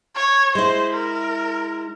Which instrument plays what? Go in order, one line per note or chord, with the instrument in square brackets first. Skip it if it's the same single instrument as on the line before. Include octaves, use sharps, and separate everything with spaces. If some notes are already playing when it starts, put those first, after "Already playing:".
[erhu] C#5
[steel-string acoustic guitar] G#3 E4 [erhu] C5
[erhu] A#4